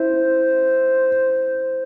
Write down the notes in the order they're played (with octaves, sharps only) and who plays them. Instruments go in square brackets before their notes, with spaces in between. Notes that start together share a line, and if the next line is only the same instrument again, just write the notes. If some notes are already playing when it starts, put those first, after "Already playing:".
Already playing: [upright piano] E4 [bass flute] C5